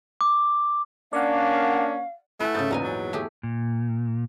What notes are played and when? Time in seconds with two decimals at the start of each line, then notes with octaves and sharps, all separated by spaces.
0.21 D6
1.13 A#3 C#4 D4 D5 F5 F#5
2.40 A3 E4 B4 F#5 G#5
2.54 G#2 C#3 D#6 G6 A6
2.71 A#1 E2 B3 D#4 G#5
2.83 F#3
3.13 A3 G4 G#4
3.43 A#2